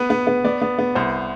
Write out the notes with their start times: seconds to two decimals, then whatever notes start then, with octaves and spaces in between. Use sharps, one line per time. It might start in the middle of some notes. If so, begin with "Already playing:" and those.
Already playing: B3 B4
0.10 B3
0.27 B3
0.44 B3 D5
0.62 B3
0.79 B3
0.95 C2 C5